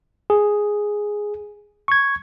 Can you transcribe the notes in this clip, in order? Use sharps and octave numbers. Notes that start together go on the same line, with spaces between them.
G#4
C#6 G#6